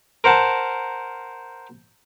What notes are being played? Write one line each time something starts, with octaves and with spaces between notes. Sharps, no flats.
A#4 C5 F#5 A5